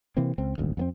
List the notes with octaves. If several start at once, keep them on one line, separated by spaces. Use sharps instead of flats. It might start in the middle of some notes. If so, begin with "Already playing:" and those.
C3 E3 A#3 C4
C#2 C4
D#1 G#1 D2
F2 B3 C4